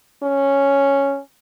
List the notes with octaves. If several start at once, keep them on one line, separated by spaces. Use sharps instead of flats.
C#4